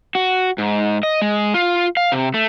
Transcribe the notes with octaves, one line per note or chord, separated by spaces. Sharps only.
F#4
G#2
D#5
G#3
F4
F5
C3
A3